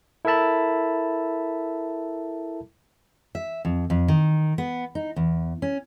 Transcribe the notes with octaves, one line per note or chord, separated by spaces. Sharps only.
E4 A4 A#4 E5 A5 B5
E5
F2
F2
D#3
B3
D#4
E2
C#4